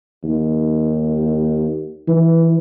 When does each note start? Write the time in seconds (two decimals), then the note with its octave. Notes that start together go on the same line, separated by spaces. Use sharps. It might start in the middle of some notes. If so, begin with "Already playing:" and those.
0.23 D#2
2.08 E3